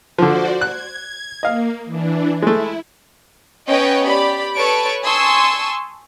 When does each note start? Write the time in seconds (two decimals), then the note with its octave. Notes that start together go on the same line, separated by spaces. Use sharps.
0.18 D3 F3 F#4 C5 D5
0.61 F#6 G#6
1.43 A#3 D#5 F5
1.85 E3 D4
2.42 G#3 A3 E4
3.69 B3 C#4 B4 C#5 D#5 G5
4.06 G4 D5 B5
4.57 A4 B4 C#5 A5 C#6 D7
5.03 G#5 A5 C6 C#6 D#6 E6